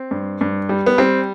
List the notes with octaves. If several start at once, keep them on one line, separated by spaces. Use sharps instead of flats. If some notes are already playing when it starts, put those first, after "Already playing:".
Already playing: C4
G2
G2
G3
B3
G3 C4